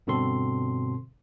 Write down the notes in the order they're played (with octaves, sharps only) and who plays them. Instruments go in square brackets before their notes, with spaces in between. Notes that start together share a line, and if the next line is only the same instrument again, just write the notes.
[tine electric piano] G2 B2 D3 C4 A4 C6